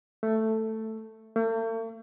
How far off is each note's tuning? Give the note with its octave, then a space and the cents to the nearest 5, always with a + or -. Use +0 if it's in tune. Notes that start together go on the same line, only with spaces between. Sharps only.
A3 +5
A3 +45